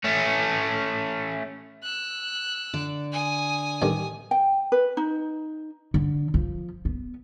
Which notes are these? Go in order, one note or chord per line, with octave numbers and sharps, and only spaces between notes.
A3 C#4
E6 F#6
D3 D5
G#5 D#6
A1 D#3 G3
G5
B4
D#4
D3
F3
B3